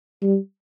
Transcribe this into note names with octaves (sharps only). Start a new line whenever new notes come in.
G3